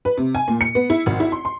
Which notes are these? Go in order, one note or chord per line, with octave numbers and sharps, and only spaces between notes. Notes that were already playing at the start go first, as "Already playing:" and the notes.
B4
C3
G#5
A#2
C#7
B3
E4
G#1
E4
C6
C6